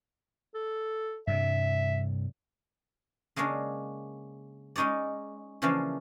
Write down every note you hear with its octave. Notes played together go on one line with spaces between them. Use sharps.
A4
G2 C3 G3 E5
C#3 G#3 A#3 C#4 D4
G#3 C#4 D#4 C#5 D5
C#3 E3 F3 A#3 C#4 D4